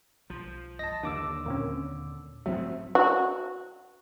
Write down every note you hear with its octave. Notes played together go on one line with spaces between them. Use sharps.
B1 F3
G1 D#5 A5 A#6
D#2 D3 F#3 D4 D6 E6
E2 A#2 A#3 C4 C#4
E1 G#2 F3 F#3 A3 C4 C#4 E5
F#4